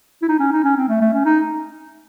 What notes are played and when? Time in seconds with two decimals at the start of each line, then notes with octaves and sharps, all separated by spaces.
0.22 E4
0.29 D#4
0.40 C#4
0.53 D#4
0.64 C#4
0.77 C4
0.89 A3
1.01 A3
1.13 C#4
1.25 D#4